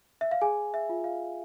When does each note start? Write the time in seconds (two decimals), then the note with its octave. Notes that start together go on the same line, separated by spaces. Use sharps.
0.21 E5
0.31 F5
0.41 G#4 G#5
0.74 E5
0.89 F4
1.04 F5